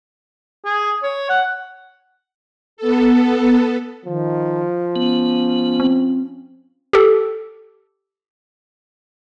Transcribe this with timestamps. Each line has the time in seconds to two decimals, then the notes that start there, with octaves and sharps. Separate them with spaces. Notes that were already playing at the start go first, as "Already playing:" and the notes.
0.65 G#4
1.03 C#5
1.29 F#5
2.77 B3 A4
4.06 D#3 F3
4.96 B3 C#4
5.80 C4
6.93 G4 A4